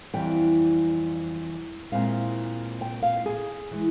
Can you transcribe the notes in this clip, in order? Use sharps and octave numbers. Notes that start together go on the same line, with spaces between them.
F2 E3 G3 G5
A#2 G#3 C4 E4 F5
G5
F5
G#4
E3 G#3